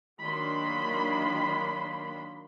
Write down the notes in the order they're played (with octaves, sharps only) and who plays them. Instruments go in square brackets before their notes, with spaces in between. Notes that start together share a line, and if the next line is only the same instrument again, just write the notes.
[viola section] D#3 F#3 A#3 D4 B5 C6